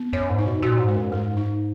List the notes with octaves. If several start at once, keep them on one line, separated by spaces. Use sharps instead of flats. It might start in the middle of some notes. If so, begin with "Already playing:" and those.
Already playing: B3
F#2 C#5
G#2
D#4
B2
A#2 F#4
G#2
G#3
F#2
G#2 G#3
D#4